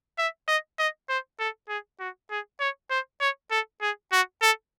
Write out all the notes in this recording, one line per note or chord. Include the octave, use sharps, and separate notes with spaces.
E5
D#5
D#5
C5
A4
G#4
F#4
G#4
C#5
C5
C#5
A4
G#4
F#4
A4